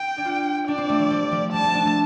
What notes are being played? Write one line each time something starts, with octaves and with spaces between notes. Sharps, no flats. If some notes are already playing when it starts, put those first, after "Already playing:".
Already playing: G5
D4
F4
D4 D5
C4
A3
F3
G3
F3
G3 A5
A3
D4
A3